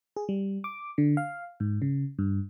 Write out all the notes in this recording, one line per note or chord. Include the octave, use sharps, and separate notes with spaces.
G#4
G3
D6
D3
F5
G#2
C#3
G2